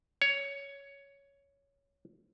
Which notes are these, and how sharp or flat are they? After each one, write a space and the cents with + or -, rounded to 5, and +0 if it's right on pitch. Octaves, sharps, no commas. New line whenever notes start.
C#5 +10